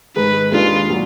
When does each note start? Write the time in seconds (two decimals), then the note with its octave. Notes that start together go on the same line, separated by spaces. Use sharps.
0.16 G#2 D#3 G#3 D#4 B4
0.52 D#2 D#3 G#3 D4 F4 G#4
0.90 A#2 F#3